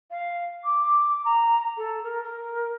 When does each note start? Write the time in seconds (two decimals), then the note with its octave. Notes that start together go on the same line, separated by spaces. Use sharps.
0.10 F5
0.64 D6
1.24 A#5
1.77 A4
2.03 A#4
2.23 A#4